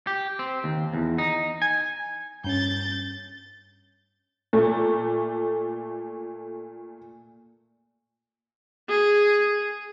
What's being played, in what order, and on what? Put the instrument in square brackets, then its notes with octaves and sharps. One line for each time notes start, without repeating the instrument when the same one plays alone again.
[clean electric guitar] G4
C4
D#2
E2
D#4
G#5
[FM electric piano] G2 C#4 [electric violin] G6 A6
[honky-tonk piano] A#2 A3
[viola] G#4